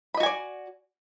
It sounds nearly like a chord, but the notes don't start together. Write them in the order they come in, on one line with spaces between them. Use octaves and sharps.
B5 D#5 F#4 G#5 D5